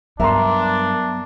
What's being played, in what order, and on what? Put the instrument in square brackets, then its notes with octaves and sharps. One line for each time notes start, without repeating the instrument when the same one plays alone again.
[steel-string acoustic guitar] G2 A#4 [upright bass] F#3 B3 [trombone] D4 [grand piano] E5 A#5 C6